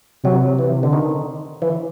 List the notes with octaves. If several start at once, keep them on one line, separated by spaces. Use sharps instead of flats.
C3 F#3
E3
D3
D#3
E3